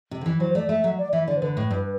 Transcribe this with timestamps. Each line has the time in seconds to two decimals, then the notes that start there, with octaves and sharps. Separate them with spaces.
0.11 C3
0.21 D3
0.26 E3
0.40 F#3 C5
0.55 A3 D5
0.69 A3 E5
0.84 F#3
0.98 D5
1.13 E3 E5
1.27 D3 D5
1.37 C5
1.42 D3 B4
1.57 A2
1.71 G2